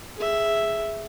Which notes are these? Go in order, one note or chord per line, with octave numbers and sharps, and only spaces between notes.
G#4 E5